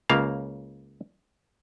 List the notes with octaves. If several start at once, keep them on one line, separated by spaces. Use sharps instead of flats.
C#2 C#3 A#3 F5